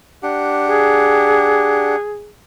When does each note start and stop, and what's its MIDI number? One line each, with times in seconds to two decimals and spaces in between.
0.23 1.96 62
0.23 1.96 67
0.23 1.96 78
0.66 2.30 68